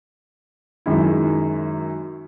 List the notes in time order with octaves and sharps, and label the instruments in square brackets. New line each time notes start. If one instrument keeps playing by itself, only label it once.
[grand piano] F#2 D#3 G#3 E4